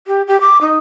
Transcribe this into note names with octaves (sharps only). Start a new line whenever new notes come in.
G4
G4
D6
D#4